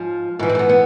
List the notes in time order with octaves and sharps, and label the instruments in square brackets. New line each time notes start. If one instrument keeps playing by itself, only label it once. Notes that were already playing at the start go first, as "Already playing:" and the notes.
Already playing: [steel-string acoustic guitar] G#2 F3 F4
G#2 E3 E4
C4
A3
B3
B3